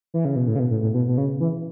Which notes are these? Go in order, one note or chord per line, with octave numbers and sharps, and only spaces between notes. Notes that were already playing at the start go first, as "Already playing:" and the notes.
E3
C#3
B2
A2
C#3
B2
A2
A2
B2
B2
C#3
E3